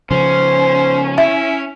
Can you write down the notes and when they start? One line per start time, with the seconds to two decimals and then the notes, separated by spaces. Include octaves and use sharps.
0.11 C#3 F3 C#4 C5
1.18 E4 E5